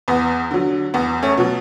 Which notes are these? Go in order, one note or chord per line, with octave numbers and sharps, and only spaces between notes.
E2 B3
D3 F#3
E2 B3
A3 C#4
B2 F#3